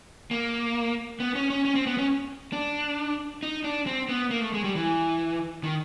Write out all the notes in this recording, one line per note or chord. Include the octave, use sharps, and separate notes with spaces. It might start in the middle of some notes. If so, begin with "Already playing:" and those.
A#3
B3
C#4
C#4
C#4
C4
B3
C#4
D4
D#4
D4
C4
B3
A#3
A3
G#3
G3
E3
D#3